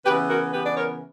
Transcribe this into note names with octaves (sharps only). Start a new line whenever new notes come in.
C#3 E3 B3 G4 B4
F#4 A#4
C#3 E3 B3 G4 B4
D5
A#4 C#5